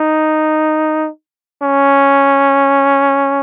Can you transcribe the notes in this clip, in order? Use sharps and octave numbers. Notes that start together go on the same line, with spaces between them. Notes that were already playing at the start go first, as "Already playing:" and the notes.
Already playing: D#4
C#4